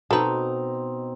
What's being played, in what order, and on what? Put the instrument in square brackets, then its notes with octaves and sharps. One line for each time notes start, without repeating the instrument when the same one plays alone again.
[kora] B2 D#4 [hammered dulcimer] C4 A#5 [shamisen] A4 B4